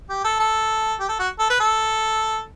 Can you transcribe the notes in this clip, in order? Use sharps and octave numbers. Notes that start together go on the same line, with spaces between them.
G4
A4
A4
G4
A4
F#4
A4
B4
A4